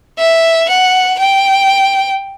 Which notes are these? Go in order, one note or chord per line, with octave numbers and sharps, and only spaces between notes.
E5
F#5
G5